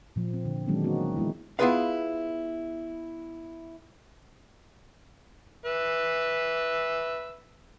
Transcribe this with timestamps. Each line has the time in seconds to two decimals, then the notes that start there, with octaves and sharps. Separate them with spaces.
0.16 A#2 F3
0.34 C4
0.45 D3
0.67 D#3 F#3 G#3 B3 C#4 D4
0.84 A#3 C4 D#4 F#4
1.16 E3 G#3 B3 E4
1.59 B3 E4 F4 G#4 B4 F5
5.65 B4 E5